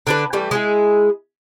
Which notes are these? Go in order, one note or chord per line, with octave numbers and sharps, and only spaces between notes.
D3 D4 B4
E3 G3 A3
G#3 E4 G#4